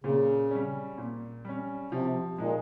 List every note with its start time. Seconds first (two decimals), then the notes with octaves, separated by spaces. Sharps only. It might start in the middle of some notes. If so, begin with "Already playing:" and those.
0.04 A#2 C#3
0.51 G3 C#4
0.98 A#2
1.45 G3 C#4
1.92 C3 F3
2.38 A#2 G#3 D#4